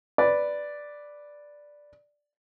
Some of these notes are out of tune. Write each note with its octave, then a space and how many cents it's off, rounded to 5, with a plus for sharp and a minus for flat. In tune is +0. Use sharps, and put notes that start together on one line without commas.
B4 +0 D5 +0